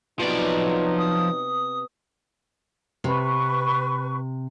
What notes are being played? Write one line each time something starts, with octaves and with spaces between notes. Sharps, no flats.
C3 F3 F#3 B3 D#4 D5
D#6
C3 B4 C#6